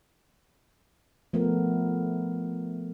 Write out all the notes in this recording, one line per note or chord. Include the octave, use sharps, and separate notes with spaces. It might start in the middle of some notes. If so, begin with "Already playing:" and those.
F3 A3 B3 A#4